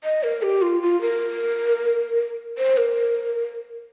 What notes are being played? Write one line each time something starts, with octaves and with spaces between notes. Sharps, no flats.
D#5
A#4
G4
F4
F4
A#4
C5
A#4